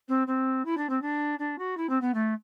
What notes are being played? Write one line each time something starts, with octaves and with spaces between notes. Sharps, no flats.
C4
C4
E4
D4
C4
D4
D4
F#4
E4
C4
B3
A3